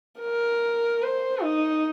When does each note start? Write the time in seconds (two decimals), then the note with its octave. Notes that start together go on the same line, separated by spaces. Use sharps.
0.21 A#4
1.03 C5
1.43 D#4